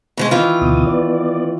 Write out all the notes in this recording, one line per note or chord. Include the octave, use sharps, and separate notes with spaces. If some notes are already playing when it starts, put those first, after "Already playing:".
B2 F3 G#3
D#3 E3 F4
D2 B2 D#6
B3 D5